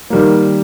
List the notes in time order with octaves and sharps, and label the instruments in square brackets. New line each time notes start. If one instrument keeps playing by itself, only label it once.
[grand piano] D#3 G3 A#3